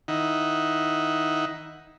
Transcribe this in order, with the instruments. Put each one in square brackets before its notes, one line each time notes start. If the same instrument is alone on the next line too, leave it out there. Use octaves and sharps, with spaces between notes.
[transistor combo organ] D#3 D#4 E4 F#5